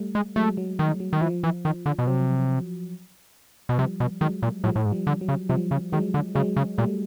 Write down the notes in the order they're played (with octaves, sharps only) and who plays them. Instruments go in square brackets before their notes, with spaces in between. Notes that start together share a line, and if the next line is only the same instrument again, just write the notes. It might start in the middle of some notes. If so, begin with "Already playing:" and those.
Already playing: [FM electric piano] G3 A3
[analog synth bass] G#3
[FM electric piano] F#3 G#3 [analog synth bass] A3
[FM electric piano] F#3
[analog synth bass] D#3
[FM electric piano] F#3
[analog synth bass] D#3
[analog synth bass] E3 [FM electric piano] F3
[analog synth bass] E3
D#3
D3
B2
[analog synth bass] C3 [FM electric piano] F#3
[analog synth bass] B2
[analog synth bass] C3 [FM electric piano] F3 G3
[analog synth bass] B2
[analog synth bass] D#3 [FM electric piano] F#3 G#3
[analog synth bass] A#2
[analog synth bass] A2 [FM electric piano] F3 G3
[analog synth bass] A2
G#2
[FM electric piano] F3 G3
[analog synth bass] D3
[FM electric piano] F#3
[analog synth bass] C#3
[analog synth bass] C3 [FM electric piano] F3 G3
[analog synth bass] C#3
[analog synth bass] D#3 [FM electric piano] F#3 G#3
[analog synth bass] D3
[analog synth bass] C#3 [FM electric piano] F#3 G#3
[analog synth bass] C#3
[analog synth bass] A#2 [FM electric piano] G3 A3